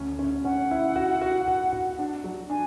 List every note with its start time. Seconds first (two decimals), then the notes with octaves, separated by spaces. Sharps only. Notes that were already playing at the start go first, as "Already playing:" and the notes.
Already playing: D2 C#4
0.19 C#4
0.44 C#4 F#5
0.71 E4
0.96 F#4
1.21 F#4
1.48 F#4
1.72 F#4
1.99 D4
2.24 F#3
2.50 D4 G#5